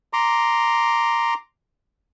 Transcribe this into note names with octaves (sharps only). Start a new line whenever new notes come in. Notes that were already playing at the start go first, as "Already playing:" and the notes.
A#5 C6 D6